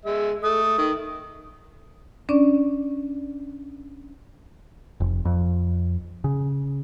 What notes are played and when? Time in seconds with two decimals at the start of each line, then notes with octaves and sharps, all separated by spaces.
0.05 G#3 E5
0.43 A3 D#6
0.78 D#3
2.29 C#4 D4 D5
5.00 F1
5.25 F2
6.24 C#3